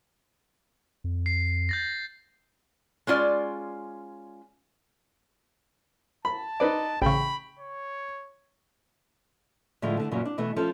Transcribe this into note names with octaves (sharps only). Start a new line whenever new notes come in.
F2
C7
G6 A6 A#6
G#3 C#4 F4 D5
A5 B5
D#4 B4 D5
A1 C#3 G5 B5 C#6
C#5
A2 D3 E3 F3 G#3
D3 A3
F#2 A#2 C#3 E3 F#3
D4
B2 E3 A3
F3 C#4 A4